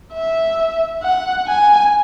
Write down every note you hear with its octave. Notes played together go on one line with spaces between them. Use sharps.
E5
F#5
G#5